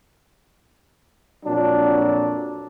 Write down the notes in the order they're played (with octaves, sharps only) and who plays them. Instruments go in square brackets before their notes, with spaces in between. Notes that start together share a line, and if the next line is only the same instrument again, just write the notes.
[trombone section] F2 A#2 F#3 D4